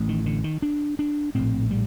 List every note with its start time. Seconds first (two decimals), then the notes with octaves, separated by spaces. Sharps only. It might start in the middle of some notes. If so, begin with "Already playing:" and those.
Already playing: A1 A2
0.09 D#3
0.26 D3
0.44 D#3
0.62 D4
0.99 D4
1.35 A#1 A2 C4
1.71 G3